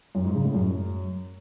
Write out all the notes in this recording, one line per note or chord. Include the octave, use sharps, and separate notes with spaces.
F#2
G#2
C#3
A2
F#2